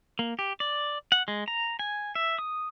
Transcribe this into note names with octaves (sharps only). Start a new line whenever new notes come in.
A#3
G4
D5
F#5
G#3
A#5
G#5
E5
D#6